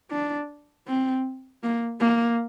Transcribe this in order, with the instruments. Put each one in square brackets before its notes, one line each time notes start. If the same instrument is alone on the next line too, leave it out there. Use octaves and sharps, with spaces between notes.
[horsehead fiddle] D4
C4
A#3
A#3